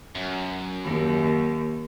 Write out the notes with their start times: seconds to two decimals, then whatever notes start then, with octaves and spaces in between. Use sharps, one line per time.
0.15 F#2
0.85 D#2